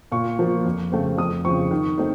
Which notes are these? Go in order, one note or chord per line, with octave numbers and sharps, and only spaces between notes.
A#2 C#6
F3 A#3 F4
F2
C#3 A3 C4
F2 D#6
C#3 F3 C4 C#6
D#3
A3 C4 D#4